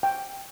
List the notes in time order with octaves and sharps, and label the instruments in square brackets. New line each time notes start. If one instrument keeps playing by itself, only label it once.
[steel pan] G5